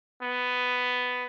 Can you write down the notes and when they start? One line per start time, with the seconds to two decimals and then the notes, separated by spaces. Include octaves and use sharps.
0.22 B3